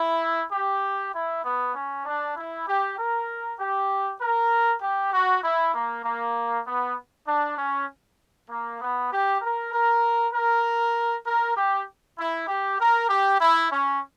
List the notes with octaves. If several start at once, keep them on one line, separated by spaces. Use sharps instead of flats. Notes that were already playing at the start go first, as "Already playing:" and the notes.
Already playing: E4
G4
E4
B3
C#4
D4
E4
G4
A#4
G4
A#4
G4
F#4
E4
A#3
A#3
B3
D4
C#4
A#3
B3
G4
A#4
A#4
A#4
A#4
G4
E4
G4
A#4
G4
E4
C#4